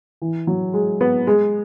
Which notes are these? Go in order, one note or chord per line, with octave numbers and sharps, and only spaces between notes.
E3
F#3
G#3
B3
G#3